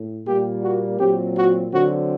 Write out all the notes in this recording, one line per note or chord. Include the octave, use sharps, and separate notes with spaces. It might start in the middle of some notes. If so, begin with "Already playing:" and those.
Already playing: A2
A#2 G3 A#3 G4
F#4
A#2 F#3 C4 G4
F#4
D3 F#3 C4 F#4